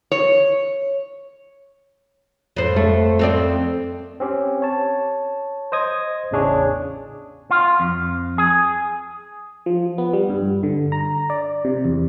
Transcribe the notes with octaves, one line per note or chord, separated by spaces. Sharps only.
C#5
F2 C5
A3
F2 C4 D5
C4 C#4 G4
C#5 A5
C5 D#5 D#6 G#6
A1 E2 C#3 D4 G#4 C#5
F4
F2
G#4
F3
B3
G3
G2
D3
A#5
D5
C3
E2